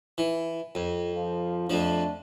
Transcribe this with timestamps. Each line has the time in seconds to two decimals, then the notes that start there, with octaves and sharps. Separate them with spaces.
0.18 E3
0.75 F2
1.14 F3
1.70 F2 F3 A3 D4